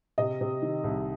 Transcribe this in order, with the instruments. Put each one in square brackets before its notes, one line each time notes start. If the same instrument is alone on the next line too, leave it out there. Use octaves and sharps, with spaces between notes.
[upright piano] C3 D#5
C3
D#3
C2